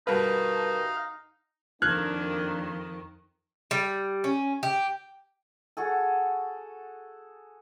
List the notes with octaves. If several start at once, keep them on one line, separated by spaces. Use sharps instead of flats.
G2 D#4 F#4 A#4 B4 F5 A5 D#6
F2 D#3 A#3 D4 F6 F#6 G#6
G3
C#4
G4
F#4 G#4 A4